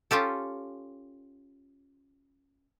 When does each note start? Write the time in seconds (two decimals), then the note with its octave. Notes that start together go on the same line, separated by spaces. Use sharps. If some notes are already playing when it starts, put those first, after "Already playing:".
0.11 C#4 F4 G4 A4